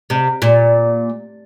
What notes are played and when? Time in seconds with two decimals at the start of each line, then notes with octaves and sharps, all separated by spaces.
0.10 C3
0.42 A#2